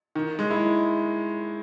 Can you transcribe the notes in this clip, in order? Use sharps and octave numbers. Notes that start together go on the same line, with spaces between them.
D#3
G#3
E4